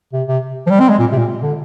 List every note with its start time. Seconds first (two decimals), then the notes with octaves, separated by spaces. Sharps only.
0.13 C3
0.28 C3
0.67 F3
0.70 G3
0.80 C4
0.89 G#3
0.99 A#2
1.12 C3
1.18 A#2
1.43 D3